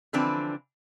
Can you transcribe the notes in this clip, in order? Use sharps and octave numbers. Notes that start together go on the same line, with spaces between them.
D3 E3 F3 C4 D4 B4